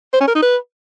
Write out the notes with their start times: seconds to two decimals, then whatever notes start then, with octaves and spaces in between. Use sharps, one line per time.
0.13 C5
0.20 C#4
0.28 A#4
0.35 D#4
0.42 B4